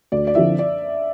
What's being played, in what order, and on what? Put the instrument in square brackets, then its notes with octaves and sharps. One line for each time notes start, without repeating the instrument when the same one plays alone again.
[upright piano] D2 [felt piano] D5
[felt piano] D5
[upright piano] D3 F3 C4 E4 [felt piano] E5
[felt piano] D5